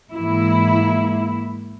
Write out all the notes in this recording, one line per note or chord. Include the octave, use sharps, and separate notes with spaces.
G#2 E3 A#3 E4